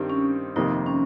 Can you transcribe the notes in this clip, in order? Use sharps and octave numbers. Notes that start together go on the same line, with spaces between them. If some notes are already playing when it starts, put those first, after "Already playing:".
Already playing: G2 D#3 G3 C4
C#4
F2 C3 D#3 A#3 D#4
C#4